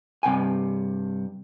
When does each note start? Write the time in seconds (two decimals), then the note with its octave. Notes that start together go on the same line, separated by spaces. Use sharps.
0.23 G2 C3 G5 G#5